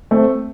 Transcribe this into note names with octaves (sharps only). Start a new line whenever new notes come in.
A3 C4